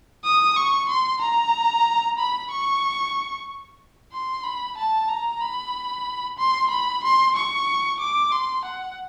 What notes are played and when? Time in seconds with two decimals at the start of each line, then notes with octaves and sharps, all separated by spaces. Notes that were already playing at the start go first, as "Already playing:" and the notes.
0.24 D#6
0.56 C#6
0.89 C6
1.22 A#5
2.18 B5
2.51 C#6
4.12 C6
4.44 B5
4.77 A5
5.09 A#5
5.41 B5
6.39 C6
6.70 B5
7.03 C6
7.36 C#6
8.00 D6
8.32 C6
8.65 F#5